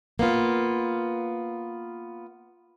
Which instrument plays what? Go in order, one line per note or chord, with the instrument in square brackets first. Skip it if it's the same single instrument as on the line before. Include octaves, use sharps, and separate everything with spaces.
[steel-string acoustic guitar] A#3 B3 F4